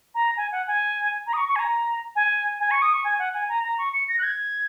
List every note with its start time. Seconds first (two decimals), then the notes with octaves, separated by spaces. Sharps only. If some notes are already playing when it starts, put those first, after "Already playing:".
0.15 A#5
0.37 G#5
0.52 F#5
0.67 G#5
1.27 A#5
1.33 D#6
1.37 C#6
1.49 C#6
1.56 G#5
1.59 A#5
2.16 G#5
2.60 G#5
2.71 C#6
2.82 D#6
2.93 C#6
3.04 G#5
3.19 F#5
3.34 G#5
3.49 A#5
3.64 A#5
3.78 C#6
3.93 C#7
4.08 A#6
4.19 F#6
4.23 G#6